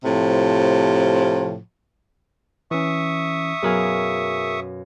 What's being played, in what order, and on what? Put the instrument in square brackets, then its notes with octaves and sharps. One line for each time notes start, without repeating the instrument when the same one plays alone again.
[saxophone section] A2 C3 F3
[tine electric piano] E3 C#4 [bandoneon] E5 C#6 D#6
[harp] F#2 B2 F5 [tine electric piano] G#4 A#4 G#5